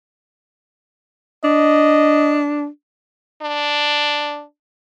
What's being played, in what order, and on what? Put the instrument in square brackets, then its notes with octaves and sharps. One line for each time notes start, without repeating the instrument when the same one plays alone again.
[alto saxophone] D4 [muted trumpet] D#5
[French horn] D4